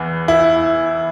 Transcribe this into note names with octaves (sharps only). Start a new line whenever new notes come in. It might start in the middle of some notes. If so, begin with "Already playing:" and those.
Already playing: E2 E3
E4